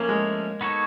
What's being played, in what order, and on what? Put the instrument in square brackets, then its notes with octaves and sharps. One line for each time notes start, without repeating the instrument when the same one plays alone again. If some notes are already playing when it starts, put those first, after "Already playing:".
Already playing: [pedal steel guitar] F3 A3 C#4 [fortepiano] A#3
[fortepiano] G#3
[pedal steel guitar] B3 D#4 F#4 A4 C#5